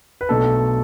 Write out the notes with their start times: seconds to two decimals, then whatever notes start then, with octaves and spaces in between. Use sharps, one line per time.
0.21 B4
0.29 B1 B2 A3 D4 A4